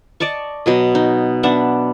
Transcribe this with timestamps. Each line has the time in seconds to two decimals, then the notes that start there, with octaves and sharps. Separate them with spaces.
0.20 D5 D#5 A5 C#6
0.66 B2 F#3 D#5
0.95 D#4
1.43 B3 D4 E5 F#5